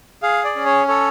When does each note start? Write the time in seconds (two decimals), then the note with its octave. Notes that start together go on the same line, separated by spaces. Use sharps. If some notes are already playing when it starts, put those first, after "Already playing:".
0.23 G#4 F5
0.44 D5
0.56 C#4
0.66 C#5
0.88 A4 C#5